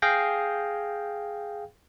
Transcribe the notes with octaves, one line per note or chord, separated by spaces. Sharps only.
G#4 F5 G5 G6 A#6